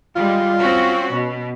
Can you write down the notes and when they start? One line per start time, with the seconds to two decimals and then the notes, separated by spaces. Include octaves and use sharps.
0.16 G3 G#3 F4
0.59 C4 C#4 F#4
1.11 B2